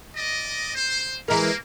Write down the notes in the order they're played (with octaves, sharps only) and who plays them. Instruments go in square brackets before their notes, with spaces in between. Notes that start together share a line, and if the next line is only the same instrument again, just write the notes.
[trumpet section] D5 D#5
C5
[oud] E3 G#3 A#4 [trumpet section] A#3